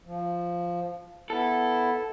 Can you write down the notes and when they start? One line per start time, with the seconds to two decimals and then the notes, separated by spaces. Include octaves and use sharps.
0.05 F3
1.30 B3 E4 A4